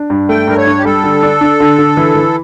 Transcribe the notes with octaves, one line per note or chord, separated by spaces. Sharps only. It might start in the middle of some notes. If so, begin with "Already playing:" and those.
Already playing: D4
G2
A3 G5
G2 A#4
C#5
D4
G4
G3 A4
D3
D4
D4
D3
D3
E3
E3